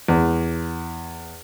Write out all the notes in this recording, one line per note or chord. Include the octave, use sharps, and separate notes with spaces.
E2